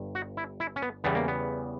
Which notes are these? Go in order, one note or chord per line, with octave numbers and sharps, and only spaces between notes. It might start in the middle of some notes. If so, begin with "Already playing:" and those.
Already playing: G1 G2
F#4
E4
E4
C#4
B3
E2 C#3 E3 G3 B3
A#3
B3